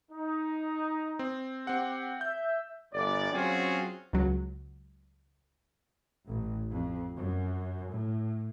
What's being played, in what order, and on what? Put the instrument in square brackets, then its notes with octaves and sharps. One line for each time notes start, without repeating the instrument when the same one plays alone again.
[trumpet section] D#4
[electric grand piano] C4
[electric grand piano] C4 F#5 [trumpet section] G4
[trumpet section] E5 [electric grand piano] G6
[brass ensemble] G1 D5
F#3 C4 C#4 F4 F#4 G#4
[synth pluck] C#2 F#3
[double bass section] A1
F2
F#2
A2